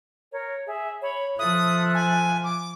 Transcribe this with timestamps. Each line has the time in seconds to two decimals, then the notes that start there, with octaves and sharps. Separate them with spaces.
0.33 A#4 C#5
0.67 G#4 E5
1.02 C#5 B5
1.39 F3 A4 E5 D#6 F#6
1.94 G#5
2.44 D6